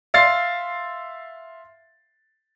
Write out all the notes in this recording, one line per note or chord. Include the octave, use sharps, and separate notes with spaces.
E5 F5 C6 A6 C7